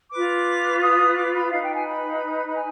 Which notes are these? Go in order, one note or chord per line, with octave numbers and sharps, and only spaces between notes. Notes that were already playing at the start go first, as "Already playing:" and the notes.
F4 B4 D6
D#6
D6
B5
D#4 B4 F5
G5
G#5
B5
B5
G#5